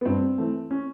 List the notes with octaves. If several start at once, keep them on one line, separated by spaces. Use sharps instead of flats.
B3
G2 C4
E3 A3
C#4